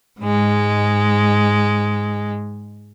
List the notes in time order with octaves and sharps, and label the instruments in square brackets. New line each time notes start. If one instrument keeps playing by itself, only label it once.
[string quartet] G#2 G#3